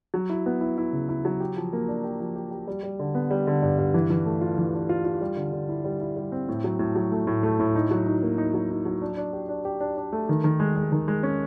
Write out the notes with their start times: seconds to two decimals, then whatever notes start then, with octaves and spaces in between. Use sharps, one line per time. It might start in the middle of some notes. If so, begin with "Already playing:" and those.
0.14 F#3
0.30 E4
0.46 B3
0.61 E4
0.78 E4
0.93 C#3
1.09 E4
1.25 F#3
1.40 G4
1.56 F3
1.73 A#3
1.88 D4
2.04 G4
2.20 F3
2.36 G4
2.51 G4
2.68 G3
2.83 G3
2.99 D3
3.15 B3
3.31 G3
3.47 D3
3.62 G2
3.78 G2
3.94 E3
4.10 E3
4.26 A3
4.41 F4
4.58 E3
4.74 D4
4.89 F4
5.05 F4
5.21 G3
5.37 D3
5.53 D3
5.69 E4
5.85 G3
6.01 E4
6.16 G3
6.32 C4
6.48 A2
6.64 F#3
6.79 A2
6.96 F#3
7.12 A3
7.27 A2
7.43 A3
7.60 A2
7.75 D#4
7.91 F#3
8.06 D#4
8.22 A#3
8.38 D#4
8.54 F#3
8.71 D#4
8.85 F#3
9.02 D4
9.17 D4
9.33 G4
9.49 D4
9.65 G4
9.80 D4
9.97 D4
10.12 A3
10.29 D#3
10.44 D#3
10.60 G#3
10.76 G#3
10.92 D#3
11.08 G#3
11.23 C#4